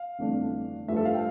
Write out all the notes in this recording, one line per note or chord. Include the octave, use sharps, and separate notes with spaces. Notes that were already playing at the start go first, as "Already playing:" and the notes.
Already playing: F5
G1 F2 E3 A3 D4
G2 F3 A3 E5
A4
F5
G5